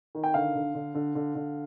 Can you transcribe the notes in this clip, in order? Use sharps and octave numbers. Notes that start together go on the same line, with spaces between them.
D#3
G5
D3 F5
D3
D3
D3
D3
D3